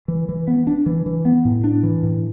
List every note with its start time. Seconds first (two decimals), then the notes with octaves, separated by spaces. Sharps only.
0.08 E3
0.29 E3
0.48 B3
0.67 D4
0.86 E3
1.06 E3
1.25 B3
1.45 A2
1.64 D4
1.83 E3
2.03 A2